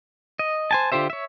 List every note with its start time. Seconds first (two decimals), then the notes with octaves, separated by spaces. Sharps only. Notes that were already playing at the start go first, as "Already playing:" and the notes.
0.39 D#5
0.71 C5 G#5 A5
0.92 D3 F4 G4 C5 E5
1.10 C#5 E5